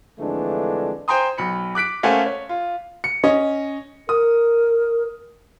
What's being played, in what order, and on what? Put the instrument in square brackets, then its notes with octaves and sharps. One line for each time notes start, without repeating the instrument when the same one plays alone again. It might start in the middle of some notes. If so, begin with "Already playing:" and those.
[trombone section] F2 D3 E3 G#3 A3 D4
[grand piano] C5 G5 G#5 A#5 C6 D#6
B1 B5 C#7
D6 F#6 B6 D7
A3 A#3 C#4 C5 F#5 G#5
C#5
F4
C#7
C#4 C#5 D#5
[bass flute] A#4 [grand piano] D#6